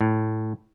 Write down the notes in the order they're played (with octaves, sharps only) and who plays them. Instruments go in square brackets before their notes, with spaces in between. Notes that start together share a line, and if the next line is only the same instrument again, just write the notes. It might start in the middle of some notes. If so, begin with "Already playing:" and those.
[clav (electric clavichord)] A2